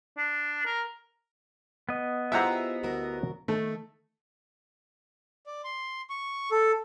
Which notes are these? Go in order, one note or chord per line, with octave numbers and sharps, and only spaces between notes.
D4
A#4
B3 D#5
E4 F4 G4 G#4 C5 E5 F#5 A#5
D2 F#4 A#4
D#3 A3
D5
C6
C#6
A4